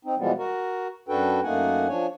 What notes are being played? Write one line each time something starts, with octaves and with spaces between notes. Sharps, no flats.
C4 D#4
B2 E3 F3 G3 G#3 B3
F#4 A#4
F#2 D4 F#4 A4 B4 G5
F#2 A3 A#3 D#4 F#5 G#5
F3 D4 C#5 G#5